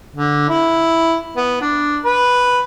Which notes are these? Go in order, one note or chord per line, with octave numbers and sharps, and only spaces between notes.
D3
E4
B3
D4
B4